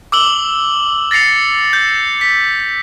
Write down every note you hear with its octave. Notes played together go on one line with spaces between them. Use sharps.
D6 E6 F#7 G7
A6 A#6 C7 C#7 F7
G6
B6